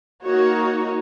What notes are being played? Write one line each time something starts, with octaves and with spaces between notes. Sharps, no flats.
A#3 D#4 F#4 C#5